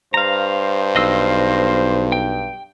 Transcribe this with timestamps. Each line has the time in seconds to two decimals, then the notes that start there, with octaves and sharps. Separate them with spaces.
0.14 G2 C5 F5 A#5
0.96 B1 D#5 F5 E6
2.12 G5